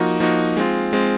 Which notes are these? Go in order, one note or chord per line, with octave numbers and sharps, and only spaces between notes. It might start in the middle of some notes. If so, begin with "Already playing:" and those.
Already playing: F3 A#3 D#4 F#4
F3 A#3 D#4 F#4
G#3 C4 F4
G#3 C4 F4